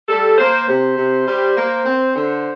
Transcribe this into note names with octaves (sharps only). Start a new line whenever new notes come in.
G3 A4
A#3 C5
C3 C5
C3
G3
A#3
C4
D3